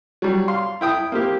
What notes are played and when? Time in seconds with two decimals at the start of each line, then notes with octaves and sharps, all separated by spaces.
0.22 F#3 G3
0.48 F5 C6
0.81 E4 G5 D#6
1.12 A#3 C4 G4